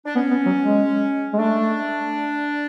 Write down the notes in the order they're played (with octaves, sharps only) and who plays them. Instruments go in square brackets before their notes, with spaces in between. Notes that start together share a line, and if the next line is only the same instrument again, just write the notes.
[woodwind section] D4
[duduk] B3 [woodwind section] C#4
[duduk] B3
F#3
G#3
G#3
[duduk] A3 [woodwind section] D4